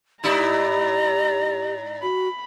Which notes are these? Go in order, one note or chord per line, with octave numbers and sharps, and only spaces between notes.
G#2 D#4 E4 G4 D5 A#5
F#4 B5